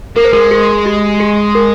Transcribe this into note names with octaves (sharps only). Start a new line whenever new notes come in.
A#3 A#4
C5
G#3 A#4
G#4
G4
G#4
A#4